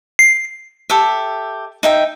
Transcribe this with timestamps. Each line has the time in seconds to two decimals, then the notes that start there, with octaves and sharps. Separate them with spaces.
0.19 C7
0.90 G4 A4 E5
1.83 D#4 E5 G5